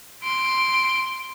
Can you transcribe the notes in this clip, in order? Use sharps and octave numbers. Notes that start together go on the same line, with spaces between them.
C6 D7